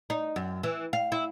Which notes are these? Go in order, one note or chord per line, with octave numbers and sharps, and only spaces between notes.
D#4
F#2
E3
F5
E4